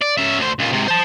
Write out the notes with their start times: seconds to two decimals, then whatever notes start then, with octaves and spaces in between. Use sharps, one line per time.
0.02 D5
0.18 C#4 E5
0.38 D2 C5
0.59 C#2 A#2
0.73 G#2 C3
0.88 C5 A5